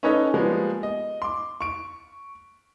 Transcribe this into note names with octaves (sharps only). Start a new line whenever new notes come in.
C#4 D#4 A4 B4 C#5 D#5
F3 G3 G#3 A#3 B3
D#5
C6 D6
C#6 D7